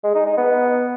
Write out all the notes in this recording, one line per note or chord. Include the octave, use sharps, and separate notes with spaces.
G#3
D#4
D#4
B3